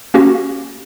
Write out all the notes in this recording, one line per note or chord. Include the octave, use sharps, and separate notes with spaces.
A#3 C#4 F#4 G4